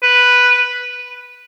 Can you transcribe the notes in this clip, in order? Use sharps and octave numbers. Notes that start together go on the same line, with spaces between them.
B4